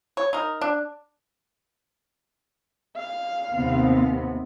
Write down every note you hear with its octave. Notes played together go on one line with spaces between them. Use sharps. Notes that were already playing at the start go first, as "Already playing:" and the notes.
C#5
D#4 A#4
D4
F5
D#2 C3 B3